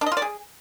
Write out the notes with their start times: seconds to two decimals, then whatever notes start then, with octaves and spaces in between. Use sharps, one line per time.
0.01 D4
0.06 D#5
0.12 F4
0.17 D5
0.22 G#4